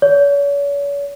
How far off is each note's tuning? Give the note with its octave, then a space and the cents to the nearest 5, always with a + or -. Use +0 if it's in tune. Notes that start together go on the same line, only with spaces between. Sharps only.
C#5 +40